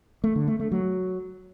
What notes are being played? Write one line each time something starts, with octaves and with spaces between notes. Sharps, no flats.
A3
D3
A3
A3
F#3